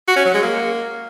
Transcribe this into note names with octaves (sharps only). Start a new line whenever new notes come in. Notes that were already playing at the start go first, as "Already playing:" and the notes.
F#4
C#4
F#3
G#3
A#3